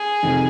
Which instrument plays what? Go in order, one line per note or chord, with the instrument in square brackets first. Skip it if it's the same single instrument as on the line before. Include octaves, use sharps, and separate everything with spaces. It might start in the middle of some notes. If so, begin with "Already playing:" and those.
Already playing: [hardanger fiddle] G#4
[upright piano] F2 C3 D#3